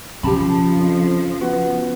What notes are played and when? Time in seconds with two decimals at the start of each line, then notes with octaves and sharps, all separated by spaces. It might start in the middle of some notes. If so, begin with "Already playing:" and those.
0.23 C#3 F3 G4 A5 B5
0.76 F2
1.41 B3 F#4